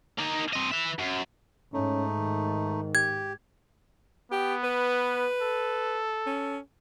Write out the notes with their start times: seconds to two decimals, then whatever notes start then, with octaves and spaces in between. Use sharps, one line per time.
0.18 A#3 D#4
0.53 C4 D#5
0.71 B4 E5
0.99 F#2
1.74 G#2 A3 C#4 D#4
2.18 D#3
2.95 G4 G#6
4.31 B3 G4
4.64 B4
5.42 A4
6.26 C#4